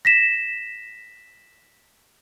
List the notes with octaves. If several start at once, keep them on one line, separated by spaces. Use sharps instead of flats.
A#6 B6 E7